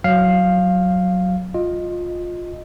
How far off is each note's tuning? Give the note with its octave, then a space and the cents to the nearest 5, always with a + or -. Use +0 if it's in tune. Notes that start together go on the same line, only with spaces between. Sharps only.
F#3 +0 F5 +0
F4 +15 D#5 -5